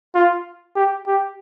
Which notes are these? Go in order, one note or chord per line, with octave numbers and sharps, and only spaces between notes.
F4
G4
G4